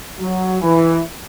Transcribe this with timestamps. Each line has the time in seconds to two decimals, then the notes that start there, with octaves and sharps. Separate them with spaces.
0.19 F#3
0.61 E3